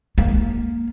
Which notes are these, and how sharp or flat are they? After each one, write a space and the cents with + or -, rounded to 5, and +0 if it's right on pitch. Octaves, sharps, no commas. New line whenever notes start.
A#3 +0